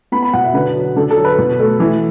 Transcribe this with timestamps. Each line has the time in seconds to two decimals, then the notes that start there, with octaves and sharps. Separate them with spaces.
0.12 B3 B5
0.22 B5
0.34 B2 F#5
0.44 E5
0.54 D3 B4
0.75 F#3
0.96 D3 A4
1.10 A4
1.17 F#3
1.25 B4
1.38 B2
1.59 A3
1.80 E3